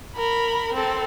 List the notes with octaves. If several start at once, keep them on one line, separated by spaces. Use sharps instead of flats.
A#4 B5
C4 A4